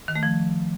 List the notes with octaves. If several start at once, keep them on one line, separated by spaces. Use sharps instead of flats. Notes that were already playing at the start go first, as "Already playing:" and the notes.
D#3
A3
F3